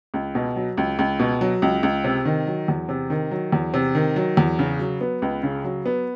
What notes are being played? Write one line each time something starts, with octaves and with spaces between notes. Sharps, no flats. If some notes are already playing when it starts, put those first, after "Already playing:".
C#2
B2
F#3
C#2
C#2
B2
F#3
C#2
C#2
C3
D#3
F#3
E2
C3
D#3
F#3
E2
C3
D#3
F#3
E2
C#3
F#3
B3
C#2
C#3
F#3
B3